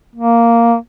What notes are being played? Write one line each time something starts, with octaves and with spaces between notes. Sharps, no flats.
A#3